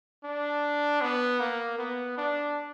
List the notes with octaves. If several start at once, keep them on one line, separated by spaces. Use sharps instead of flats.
D4
B3
A#3
B3
D4